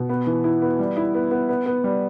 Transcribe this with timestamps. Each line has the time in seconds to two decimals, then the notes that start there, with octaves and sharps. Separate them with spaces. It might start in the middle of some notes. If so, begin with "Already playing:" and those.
Already playing: B2
0.09 B3
0.27 E3
0.44 E4
0.62 B3
0.79 G3
0.97 E4
1.14 B3
1.31 B3
1.49 B3
1.66 B3
1.84 G3